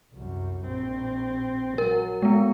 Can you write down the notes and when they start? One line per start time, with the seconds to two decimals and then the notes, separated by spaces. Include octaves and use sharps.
0.14 C2 F#2
0.67 A#1 C4
1.78 F#3 A#4
2.22 G#3 B3